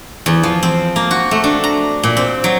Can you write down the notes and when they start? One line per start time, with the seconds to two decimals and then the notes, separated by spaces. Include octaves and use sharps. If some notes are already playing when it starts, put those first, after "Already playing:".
0.26 E2
0.43 F3
0.63 C4
0.96 A#3
1.11 F#4
1.31 A3
1.44 D4
1.64 A#5
2.03 A#2
2.17 C4
2.44 F#3